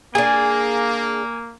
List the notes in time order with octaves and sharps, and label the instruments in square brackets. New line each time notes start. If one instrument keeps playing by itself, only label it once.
[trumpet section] A#3 [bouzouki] D4 G#4 [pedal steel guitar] G#5